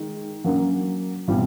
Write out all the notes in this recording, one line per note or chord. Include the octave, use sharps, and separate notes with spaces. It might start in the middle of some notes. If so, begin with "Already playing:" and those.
Already playing: D#3 G#3
F#3 A#3 C#4 F#4
B2 G3 C4 E4